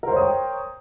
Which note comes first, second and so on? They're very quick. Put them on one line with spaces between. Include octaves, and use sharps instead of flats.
A#4 C5 C#5 D#6 G5